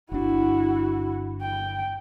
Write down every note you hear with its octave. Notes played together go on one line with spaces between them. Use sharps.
G1 D4 E4 F#4
G5